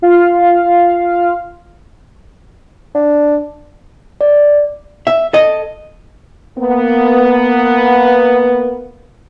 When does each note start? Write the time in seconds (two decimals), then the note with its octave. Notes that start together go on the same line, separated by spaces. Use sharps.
0.02 F4 F5
2.95 D4
4.21 D5
5.07 E5
5.33 A4 D#5
6.59 A#3 B3